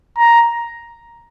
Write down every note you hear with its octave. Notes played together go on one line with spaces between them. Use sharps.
A#5